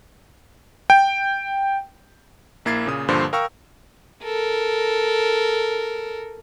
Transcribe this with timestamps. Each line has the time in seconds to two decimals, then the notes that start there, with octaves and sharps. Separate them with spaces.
0.90 G5
2.65 A#1 A#3 E4 G#6 A6 C7
2.86 A#2 C#3 D#6
3.08 G2 A#2 D3 F3 C5 C6
3.33 A#4 F5 G5 C#6 E6
4.24 A4 A#4